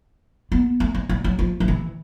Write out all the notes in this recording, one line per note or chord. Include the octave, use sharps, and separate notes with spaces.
B3
A3
G#3
G3
F#3
F3
F3
E3